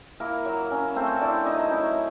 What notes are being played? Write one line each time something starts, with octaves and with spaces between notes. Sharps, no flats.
A#3 E4 A#4
F#3
C#4
A3 C4 C5
D4 E4 D5
F#3 D#4 D#5
C#4 E4 E5